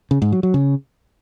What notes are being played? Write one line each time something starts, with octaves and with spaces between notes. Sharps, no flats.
C#3
G#2
F#3
F#3
C#3